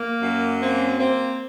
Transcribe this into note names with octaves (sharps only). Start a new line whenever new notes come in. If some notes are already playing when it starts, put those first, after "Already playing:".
Already playing: A#3
F#2
A#3 C4
A#3 C4